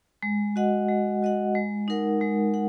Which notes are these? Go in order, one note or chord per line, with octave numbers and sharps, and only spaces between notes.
G#3
F#4 D#5 F#5
G#3
F#4 D#5 F#5
G#3
D#4 A#4 F#5
G#3
F#5